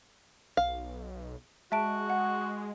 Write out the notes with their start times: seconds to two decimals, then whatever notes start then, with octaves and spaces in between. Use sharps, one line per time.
0.57 B1 F5
1.72 G#3 F#4 E5 A5 D7
2.10 F#5